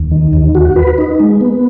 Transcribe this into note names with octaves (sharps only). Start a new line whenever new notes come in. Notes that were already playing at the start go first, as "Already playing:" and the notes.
Already playing: D#2
D#3
D#2
F#4
B4
D#4
G#3
B3